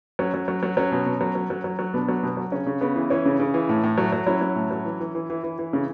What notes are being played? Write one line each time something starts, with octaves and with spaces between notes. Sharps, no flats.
F#3 C#4
F#3
F#3
F#3
F#3 C#4
B2
B2
F#3
F#3
F#3
F#3
F#3
B2 B3 D4
F#3
B2
F#3
C#3 C#4
C#3
C#3 B3
E3
E3 C#4
C#3
C#3
E3
A2
A2
F#3
F#3
F#3 C#4 E4
F#3
A2
F#3
E3
E3
E3
E3
E3
E3
C#3